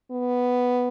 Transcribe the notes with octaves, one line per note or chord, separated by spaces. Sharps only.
B3